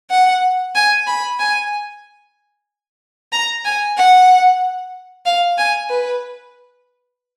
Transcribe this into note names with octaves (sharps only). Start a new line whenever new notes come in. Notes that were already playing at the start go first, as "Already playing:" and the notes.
F#5
G#5
B5
G#5
A#5
G#5
F#5
F5
G#5
B4